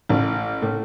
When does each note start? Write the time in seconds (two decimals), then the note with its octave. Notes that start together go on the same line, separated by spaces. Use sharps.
0.09 A1
0.62 A2